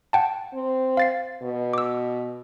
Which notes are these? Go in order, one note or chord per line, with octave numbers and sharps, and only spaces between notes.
F#5 G5 A5
C4
F5 A6 C7
B2
D6 E6